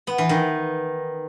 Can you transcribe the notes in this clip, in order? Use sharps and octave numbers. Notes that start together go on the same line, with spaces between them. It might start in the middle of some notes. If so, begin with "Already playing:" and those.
B3
E3
D#3